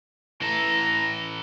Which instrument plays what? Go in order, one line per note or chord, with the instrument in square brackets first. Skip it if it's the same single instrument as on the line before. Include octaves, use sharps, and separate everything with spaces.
[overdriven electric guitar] E3 A4 [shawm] A#5